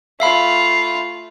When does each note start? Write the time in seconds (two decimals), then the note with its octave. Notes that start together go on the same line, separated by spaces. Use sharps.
0.20 A3 F4 E5 F5 B5